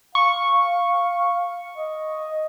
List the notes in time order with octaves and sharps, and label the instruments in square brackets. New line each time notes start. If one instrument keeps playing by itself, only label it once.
[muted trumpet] F5 [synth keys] C#6
[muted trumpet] D#5